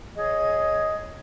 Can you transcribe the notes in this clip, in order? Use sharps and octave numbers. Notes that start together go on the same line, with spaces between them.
G#4 C#5 D#5 G#6